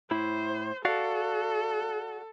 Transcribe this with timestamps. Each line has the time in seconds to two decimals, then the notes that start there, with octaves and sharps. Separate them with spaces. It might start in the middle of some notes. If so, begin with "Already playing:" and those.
0.11 A2 E4 C5
0.85 F#4 A4 D5 F5